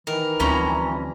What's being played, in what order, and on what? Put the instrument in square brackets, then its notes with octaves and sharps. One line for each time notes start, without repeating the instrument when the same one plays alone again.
[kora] D#3 [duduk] E3 [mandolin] A#4
[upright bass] D2 C4 [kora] F3 G3 E4 [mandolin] C#4 A#5